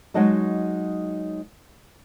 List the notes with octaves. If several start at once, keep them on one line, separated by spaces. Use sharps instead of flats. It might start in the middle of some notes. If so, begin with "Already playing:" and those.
F#3 G#3 D#4 F#4 D#5 A5